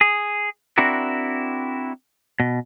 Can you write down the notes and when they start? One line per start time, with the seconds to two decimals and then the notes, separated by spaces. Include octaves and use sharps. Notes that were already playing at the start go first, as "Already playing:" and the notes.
0.01 G#4
0.78 C4 D4 E4 F#4 A#4
2.40 B2